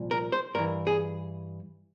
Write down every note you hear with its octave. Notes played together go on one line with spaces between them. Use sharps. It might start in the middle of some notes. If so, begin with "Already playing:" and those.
Already playing: C2 A#2 F3
A#4
C5
G2 E3 A#4
G#4